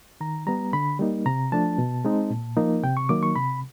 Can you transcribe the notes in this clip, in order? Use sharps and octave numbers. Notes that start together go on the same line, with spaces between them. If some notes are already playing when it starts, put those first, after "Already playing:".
D#3 A#5
G3 B3 A#5
D3 B5
G3 A#3 D#4
C3 A#5
F3 A3 D4 A5
B2
G#3 C4 D#4
A#2
F3 A#3 D#4
C3 G5
C#6
D#3 F#3 A#3 D#4 D6
C#6
C3 B5